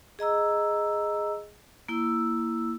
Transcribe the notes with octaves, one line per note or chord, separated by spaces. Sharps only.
G#4 D#5 A#5 E6
A#3 E4 E6